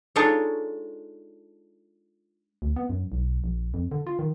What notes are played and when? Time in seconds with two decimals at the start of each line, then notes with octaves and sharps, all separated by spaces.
0.16 G#3 D4 D#4 F4 A4 C#5
2.62 D2
2.76 B3
2.90 F#2
3.12 B1
3.44 A#1
3.74 F2
3.91 D3
4.07 F4
4.19 D#3